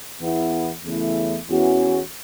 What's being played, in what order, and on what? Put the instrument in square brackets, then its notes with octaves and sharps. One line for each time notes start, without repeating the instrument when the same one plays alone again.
[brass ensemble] E2 E3 B3 E4
E2 C#3 A3 E4
E2 E3 C#4 F#4